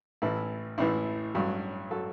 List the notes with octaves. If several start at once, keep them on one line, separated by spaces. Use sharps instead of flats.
A1 A2 E3 E4
A1 A2 E3 E4
A1 G2 F#3
F#3 A4